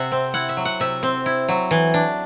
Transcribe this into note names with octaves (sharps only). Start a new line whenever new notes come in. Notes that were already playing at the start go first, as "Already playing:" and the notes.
Already playing: C3 E5 F#5
C4
E4 F#5
E5
F#3
F#5
C3 E5
C4
E4
F#3
E3
D4